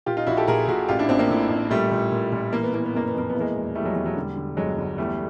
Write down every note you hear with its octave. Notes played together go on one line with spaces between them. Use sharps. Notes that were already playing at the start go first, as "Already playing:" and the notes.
A#2 F4 G4
D#4 F4
A#1 E4 F#4
G4 A4
A#2 G#4 A#4
A#2 F#4 G#4
A1 F4 G4
D4 E4
A1 C4 D4
A#3 C4
A2
A1
A#2 G3 A3
A#2
A#2
A#2
E3 A#3
B3
E3 A#3
B3
F#1 A#3
B3
F2 A#3
B3
E3
G#3 A#3
E1
E3 G3 A3
F#3 G#3
E1 F#3
F#3
D3 G3
D3
G1 F#3 G#3
G1
E2 G3 A3